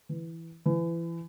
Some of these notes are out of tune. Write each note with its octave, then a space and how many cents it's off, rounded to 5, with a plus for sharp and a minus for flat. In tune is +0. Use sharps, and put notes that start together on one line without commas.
E3 +0
E3 +25